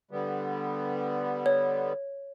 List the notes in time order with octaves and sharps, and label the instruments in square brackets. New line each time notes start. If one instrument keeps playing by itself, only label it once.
[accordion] D3 G3 B3
[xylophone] C#5